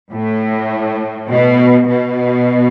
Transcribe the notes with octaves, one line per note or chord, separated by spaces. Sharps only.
A2
B2
B2